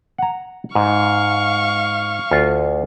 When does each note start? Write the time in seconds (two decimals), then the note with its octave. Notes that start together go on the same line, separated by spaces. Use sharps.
0.18 F#5 A#5
0.75 G#2 F5 C#6
2.31 D2 F4